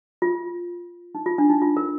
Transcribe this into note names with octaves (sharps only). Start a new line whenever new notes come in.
F4
D#4
F4
D4
D#4
F4
A#4